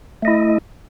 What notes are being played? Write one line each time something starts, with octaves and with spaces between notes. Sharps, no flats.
A3 E4 D#5